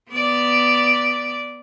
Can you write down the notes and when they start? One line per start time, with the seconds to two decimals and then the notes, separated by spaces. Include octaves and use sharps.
0.11 B3 D5